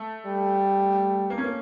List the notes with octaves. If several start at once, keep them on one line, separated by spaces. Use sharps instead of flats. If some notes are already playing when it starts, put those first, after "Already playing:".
Already playing: A3
G3
A#3
C#4
A#3